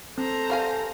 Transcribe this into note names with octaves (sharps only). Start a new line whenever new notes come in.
C4 A4 C5 A#5
G3 F5 G#5